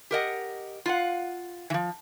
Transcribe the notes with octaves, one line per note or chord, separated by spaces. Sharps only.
G4 A#4 D#5 F#5
F4 F5 F#5
E3 F3